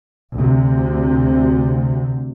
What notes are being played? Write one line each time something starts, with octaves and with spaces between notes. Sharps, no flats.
D2 C3